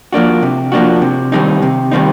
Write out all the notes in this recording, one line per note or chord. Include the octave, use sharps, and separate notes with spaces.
F3 A#3 D4 F#4
C3
F3 A#3 D4 F#4
C3
D#3 G3 C4 D#4
C3
D#3 G3 C4 D#4